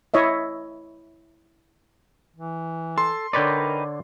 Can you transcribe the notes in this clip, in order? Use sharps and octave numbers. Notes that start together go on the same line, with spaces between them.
E4 C#5 D#5 E5
E3
A4 C6
D3 D#4 A#4 B4 C#5 D5 G5